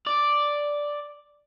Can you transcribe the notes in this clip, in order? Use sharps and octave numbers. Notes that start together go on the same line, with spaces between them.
D5